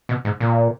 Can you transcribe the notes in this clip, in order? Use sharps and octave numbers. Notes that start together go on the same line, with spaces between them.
B2
G#2
A#2